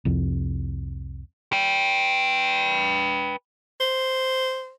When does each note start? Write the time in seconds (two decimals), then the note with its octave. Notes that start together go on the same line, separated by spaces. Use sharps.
0.05 C2 F2
1.53 B4 G5
3.81 C5